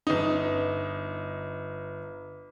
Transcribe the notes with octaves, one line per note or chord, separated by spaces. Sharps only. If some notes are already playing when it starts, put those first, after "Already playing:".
G1 D#4